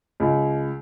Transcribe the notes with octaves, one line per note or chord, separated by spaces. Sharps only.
C#2